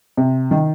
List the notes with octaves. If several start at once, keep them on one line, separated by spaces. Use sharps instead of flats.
C3
D#3